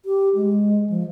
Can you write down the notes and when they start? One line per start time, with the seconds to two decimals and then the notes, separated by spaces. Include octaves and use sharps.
0.05 G4
0.35 G#3
0.90 F3